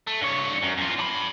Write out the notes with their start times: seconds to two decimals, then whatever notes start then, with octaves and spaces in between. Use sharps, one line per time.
0.07 A3
0.21 G2 C#5
0.62 F#2
0.78 E2 F4
0.99 D4 B5